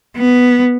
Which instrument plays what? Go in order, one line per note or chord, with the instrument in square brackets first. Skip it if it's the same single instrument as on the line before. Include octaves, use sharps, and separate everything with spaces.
[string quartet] B3